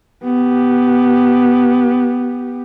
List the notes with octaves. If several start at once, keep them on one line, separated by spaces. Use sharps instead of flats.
B3 G4